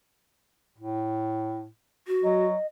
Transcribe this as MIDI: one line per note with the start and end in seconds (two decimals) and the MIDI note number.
0.78 1.68 45
2.07 2.46 66
2.24 2.56 54
2.24 2.66 75